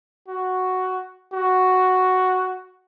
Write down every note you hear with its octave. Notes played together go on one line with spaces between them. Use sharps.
F#4
F#4